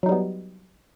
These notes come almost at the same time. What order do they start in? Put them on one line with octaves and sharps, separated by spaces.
F#3 D#4 G3 B3